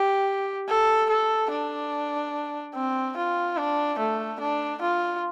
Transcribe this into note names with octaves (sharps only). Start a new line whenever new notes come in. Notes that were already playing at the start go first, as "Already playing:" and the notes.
Already playing: G4
A4
A4
D4
C4
F4
D4
A3
D4
F4